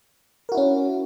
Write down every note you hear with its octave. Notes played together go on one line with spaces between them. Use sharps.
C#4 E4 F#4 A#4